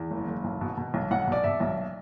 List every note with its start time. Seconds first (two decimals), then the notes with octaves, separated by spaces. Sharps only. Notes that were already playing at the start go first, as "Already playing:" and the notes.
Already playing: E2
0.11 F#1
0.28 F#1
0.44 B1
0.61 B2
0.77 B2
0.94 B1
1.11 B1 F#5
1.27 B2 D5
1.44 B2 E5
1.60 B1